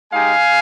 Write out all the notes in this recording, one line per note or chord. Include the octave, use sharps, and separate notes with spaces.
G#3 D#4 G4 F5 G#5